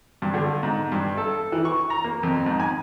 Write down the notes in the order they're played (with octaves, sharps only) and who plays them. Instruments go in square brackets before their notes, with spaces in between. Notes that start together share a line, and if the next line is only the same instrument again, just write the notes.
[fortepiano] G2
D3
G#2
G2
A4
E3
C#6
A#5
A#3
F2
G#2
G#5